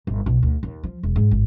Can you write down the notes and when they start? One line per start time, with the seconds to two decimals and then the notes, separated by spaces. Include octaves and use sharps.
0.07 G1
0.26 B1
0.43 D2
0.63 D#2
0.83 F3
1.03 E1
1.16 G#2
1.31 G#1